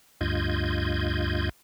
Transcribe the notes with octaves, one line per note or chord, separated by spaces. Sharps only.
D2 G2 F4 D#5 G6 G#6